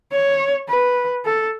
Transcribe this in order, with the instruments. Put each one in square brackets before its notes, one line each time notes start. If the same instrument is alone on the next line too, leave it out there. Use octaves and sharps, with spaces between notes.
[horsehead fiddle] C#5
B4
A4